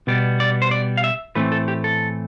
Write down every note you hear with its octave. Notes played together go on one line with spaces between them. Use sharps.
B2 G3 B3 D5
D5
C5
D5
F5
E5
A2 E3 A3 C4 B4
A4
G4
A4